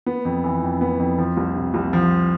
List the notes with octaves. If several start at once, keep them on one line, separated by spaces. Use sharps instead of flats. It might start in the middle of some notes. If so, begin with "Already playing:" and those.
B3
F2
E3
F2
B3
F2
F3
C2
C3
C2
F3